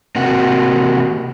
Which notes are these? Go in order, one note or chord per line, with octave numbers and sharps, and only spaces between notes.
C3 A#3 F#4